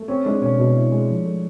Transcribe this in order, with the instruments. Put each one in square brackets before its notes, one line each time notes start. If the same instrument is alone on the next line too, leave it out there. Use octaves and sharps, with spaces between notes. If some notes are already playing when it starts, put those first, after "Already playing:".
Already playing: [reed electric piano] A3
[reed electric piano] C4 [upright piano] C#4
[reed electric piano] G#3 [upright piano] D4
[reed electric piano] B2 [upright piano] C#4
[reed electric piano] B2
E4
G#3
F3
A3